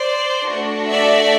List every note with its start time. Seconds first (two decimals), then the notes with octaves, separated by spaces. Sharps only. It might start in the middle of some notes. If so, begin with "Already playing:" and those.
Already playing: C5 D5
0.49 A3 D4 F#4
0.87 D5 E5